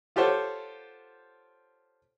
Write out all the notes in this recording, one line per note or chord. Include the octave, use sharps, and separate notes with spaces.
F4 G4 A4 C5 C#5 F#5